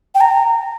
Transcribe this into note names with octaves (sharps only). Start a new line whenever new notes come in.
G5
A#5